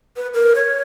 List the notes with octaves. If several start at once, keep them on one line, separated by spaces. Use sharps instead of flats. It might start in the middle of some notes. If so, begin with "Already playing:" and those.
B4
A#4
C#5